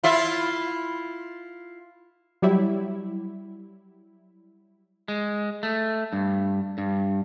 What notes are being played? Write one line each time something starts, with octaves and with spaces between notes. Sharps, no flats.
E4 F4 E5
F#3 G3 E4
G#3
A3
G2
G2